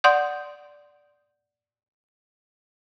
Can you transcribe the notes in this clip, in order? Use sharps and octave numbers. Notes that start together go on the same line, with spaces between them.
D5 F#5 C6 D#6 G6